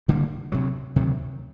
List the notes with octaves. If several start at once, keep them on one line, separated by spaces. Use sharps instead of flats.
D2 D3 G3 A#3
D2 C3 D#3 F#3
D2 C3 D#3 F#3